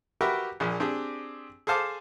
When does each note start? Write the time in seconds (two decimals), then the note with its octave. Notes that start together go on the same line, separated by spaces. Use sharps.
0.21 F#4 G4 A#4 B4 E5 G5
0.60 A#1 A#2 F3 G#4
0.80 C4 D4 G4 G#4
1.67 G#4 A4 C5 F5 A5 D6